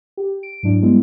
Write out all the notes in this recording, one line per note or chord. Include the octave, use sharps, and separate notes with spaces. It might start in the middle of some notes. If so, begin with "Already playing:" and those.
G4
D7
G#2 F#3 D4 E4
G3 G#3 B3 E4